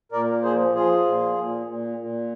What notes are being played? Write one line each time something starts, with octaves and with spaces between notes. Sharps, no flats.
A#2 A#4 D5
F3 G#4 C5
F3 F4 G#4
A#2
A#2
A#2
A#2